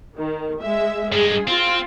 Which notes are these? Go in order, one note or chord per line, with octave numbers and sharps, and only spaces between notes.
D#3
G#3 E5
G2 G#3 G#4
C4 F4